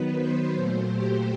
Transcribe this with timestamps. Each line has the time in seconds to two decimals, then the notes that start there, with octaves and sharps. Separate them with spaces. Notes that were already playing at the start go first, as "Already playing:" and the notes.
Already playing: D#3 F#3 B3 B4
0.15 C5
0.53 A#2 F#3 A3
0.91 G4